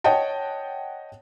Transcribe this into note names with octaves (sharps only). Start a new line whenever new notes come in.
C#5 D#5 F#5 G5 A5